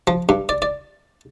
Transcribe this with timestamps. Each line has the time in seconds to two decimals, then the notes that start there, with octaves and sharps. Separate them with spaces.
0.07 F3
0.29 G2
0.49 D5
0.62 D5